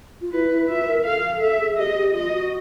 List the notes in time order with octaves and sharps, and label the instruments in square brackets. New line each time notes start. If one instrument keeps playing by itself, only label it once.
[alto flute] F4
[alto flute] E4 [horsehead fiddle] B4
[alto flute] E4
[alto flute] F4 [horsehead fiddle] E5
[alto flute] B4
A#4
[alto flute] A4 [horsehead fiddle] F5
[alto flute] A4 [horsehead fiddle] E5
[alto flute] G#4
[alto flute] G4 [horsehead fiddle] D#5
[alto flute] G#4
G4
[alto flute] F4 [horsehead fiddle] D#5
[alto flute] F#4